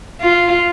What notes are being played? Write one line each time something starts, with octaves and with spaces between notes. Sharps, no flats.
F4